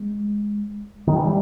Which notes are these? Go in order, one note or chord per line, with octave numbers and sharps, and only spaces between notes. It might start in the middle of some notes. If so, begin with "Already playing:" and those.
Already playing: G#3
D#3
E3
G3